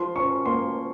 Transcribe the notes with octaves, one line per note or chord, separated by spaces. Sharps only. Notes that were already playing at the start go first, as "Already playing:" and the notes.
Already playing: F3 C6
C#4 C#6
A#3 C6